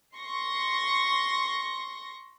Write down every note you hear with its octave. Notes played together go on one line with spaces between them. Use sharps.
C6 C#6 A#6